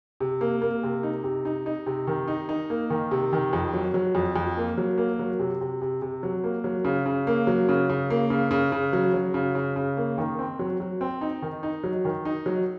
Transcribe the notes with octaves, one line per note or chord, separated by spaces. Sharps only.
C3
A#3
A#3
C3
D#4
C3
D#4
D#4
C3
D#3
D#4
D#4
A#3
D#3
C3
D#3
F2
F#3
F#3
F2
F2
A#3
F#3
A#3
F#3
C3
C3
C3
C3
F#3
A#3
F#3
C#3
C#3
A#3
F#3
C#3
C#3
A#3
C#3
C#3
C#3
F#3
F#3
C#3
C#3
C#3
A#3
D#3
C4
F#3
F#3
C4
D#4
D#3
D#4
F#3
D#3
D#4
F#3